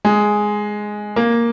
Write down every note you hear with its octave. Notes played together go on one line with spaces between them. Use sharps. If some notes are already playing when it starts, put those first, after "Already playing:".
G#3
A#3